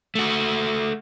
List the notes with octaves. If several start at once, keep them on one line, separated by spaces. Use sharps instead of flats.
A3 F#4